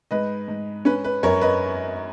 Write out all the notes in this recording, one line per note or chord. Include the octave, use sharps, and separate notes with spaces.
G#2 B4 D#5
G#2
C#4 B4
B4
F#2 A#4 C#5
B4 D#5